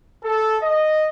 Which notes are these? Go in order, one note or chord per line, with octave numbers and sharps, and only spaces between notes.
A4
D#5